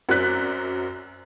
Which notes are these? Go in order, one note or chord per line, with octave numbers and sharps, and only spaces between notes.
F#2 F#3 C4 D5 F#6 B6